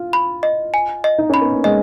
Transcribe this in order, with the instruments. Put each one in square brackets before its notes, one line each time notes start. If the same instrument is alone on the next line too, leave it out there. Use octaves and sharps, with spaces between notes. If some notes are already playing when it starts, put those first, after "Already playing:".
Already playing: [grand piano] F4
[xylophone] B5
D#5
G#5
D#5
[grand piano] D#4
[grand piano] C#4 [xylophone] B5
[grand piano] B3
A#3
[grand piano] G#3 [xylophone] D#5